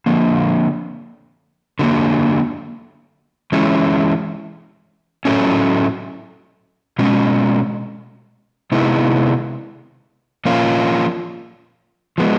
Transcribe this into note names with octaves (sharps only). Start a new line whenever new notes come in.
D3 F3 A#3
D3 F#3 A#3
E3 G#3 C#4 E4
A2 F#3 A3 C#4
B2 G#3 C#4
C3 D#3 G#3 B3 E4
F3 A#3 C#4 F4
F3 G#3 B3